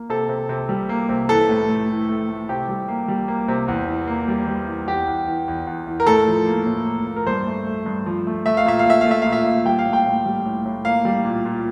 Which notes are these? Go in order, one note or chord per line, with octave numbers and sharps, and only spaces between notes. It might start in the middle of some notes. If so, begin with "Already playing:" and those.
Already playing: A#3
C3 A4
C3
C3
G3
A#3
C3
E3 A4
A2
A3
E3
A3
A3
C3 G4
G3
A#3
G3
A#3
C3
E2
E3
A#3
G3
G3
E3
E2 G4
E2
E3
E2
E2
E3
A#4
A2 A4
F3
A#3
A2
A#3
A#3
A#4
G2 C5
A3
A3
G2
F3
A3
A3 E5
F5
A#2 E5
F5
A3 E5
A3 F5
E5
A#2 F5
E5
A#2
G3 G5
F5
A2
G5
A2
G3
A2
A2
A#3 F5
G3
A#2
A#2